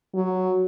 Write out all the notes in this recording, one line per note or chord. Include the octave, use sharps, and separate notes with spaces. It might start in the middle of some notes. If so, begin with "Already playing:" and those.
F#3